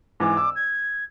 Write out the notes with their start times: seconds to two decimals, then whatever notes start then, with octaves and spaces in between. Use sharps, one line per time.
0.20 G#2 E3 D6
0.37 E6
0.55 G#6